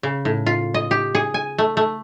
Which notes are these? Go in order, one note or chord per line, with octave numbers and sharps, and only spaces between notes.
C#3
A2
F4
D#5
G4
G#4
G#5
A3
A3